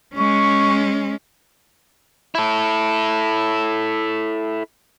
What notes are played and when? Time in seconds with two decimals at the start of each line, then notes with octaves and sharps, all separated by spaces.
0.14 G#3 C#4 C#6
2.35 E4 A4